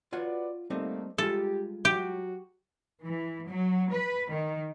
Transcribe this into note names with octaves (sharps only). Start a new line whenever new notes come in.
F4 F#4 B4 C#5 D5 F#5
G3 A3 A#3 C4 D#4
G3 G#3 F4 G4 A4
F#3 F#4 G4
E3
F#3
B4
D#3